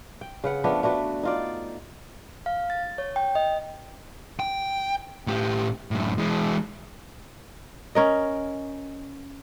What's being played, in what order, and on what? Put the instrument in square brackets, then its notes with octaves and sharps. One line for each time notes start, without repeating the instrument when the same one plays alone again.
[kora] G5
C#3 B4 F#5
F3 A3 B3 D4
A3 D4 F#4 B4
D#4 F4 D5
[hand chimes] F5
A6
C#5
G5
D#5
[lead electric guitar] G5
A2 G4
F#2 A2
E3 G#3
[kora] C#4 A#4 D#5